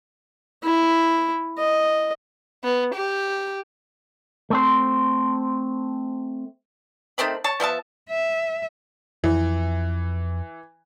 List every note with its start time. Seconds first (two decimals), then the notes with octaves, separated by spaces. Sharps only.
0.64 E4
1.58 D#5
2.64 B3
2.95 G4
4.50 A3 C4 C5
7.18 D#3 A3 C4 B5
7.44 C#5 A5
7.60 F3 B3 E5 A5
8.10 E5
9.24 F2 E3